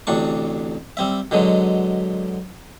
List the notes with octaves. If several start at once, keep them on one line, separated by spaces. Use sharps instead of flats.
A1 D2 C3 D4 C#6
G3 C4 E5
B2 D3 F#3 G#3